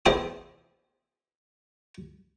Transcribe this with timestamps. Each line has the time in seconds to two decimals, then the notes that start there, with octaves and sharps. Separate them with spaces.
0.06 E2 E3 C4 C5 D#6